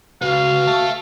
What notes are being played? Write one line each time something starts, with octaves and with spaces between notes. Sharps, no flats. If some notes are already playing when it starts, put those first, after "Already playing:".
C#2 F#4 B4 F5
E5 A5